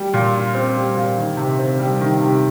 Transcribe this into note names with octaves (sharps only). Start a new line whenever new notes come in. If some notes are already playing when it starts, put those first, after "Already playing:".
Already playing: G3
A#2
F4
C4
G3
A#2
D#3
C3
C4
G3
D#3
C3